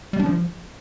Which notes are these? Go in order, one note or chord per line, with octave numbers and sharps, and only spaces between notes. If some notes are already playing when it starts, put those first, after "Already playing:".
G3
D4
F3